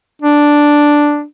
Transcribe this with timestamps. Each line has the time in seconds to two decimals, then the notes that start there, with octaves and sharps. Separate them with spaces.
0.22 D4